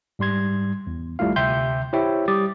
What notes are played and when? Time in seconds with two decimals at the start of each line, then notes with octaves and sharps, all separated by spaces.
0.19 G#2 G3 C6 G#6
0.87 E2
1.19 G#1 G3 A3 E4 F4 F5
1.36 D2 C3 E5 G5 C6 G6
1.93 E4 G4 C5 C#5 E5 G5
2.28 G3 G4 D6 D#6 A6